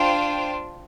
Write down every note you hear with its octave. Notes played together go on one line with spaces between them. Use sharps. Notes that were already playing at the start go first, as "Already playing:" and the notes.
Already playing: D4 F4 C5 G5